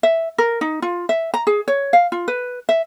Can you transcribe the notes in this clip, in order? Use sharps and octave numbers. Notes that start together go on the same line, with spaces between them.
E5
A#4
D#4
F4
E5
A#5
G#4
C#5
F5
F4
B4
E5